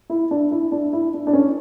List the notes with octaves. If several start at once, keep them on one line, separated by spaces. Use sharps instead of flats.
E4
D4
E4
D4
E4
D4
D4
C#4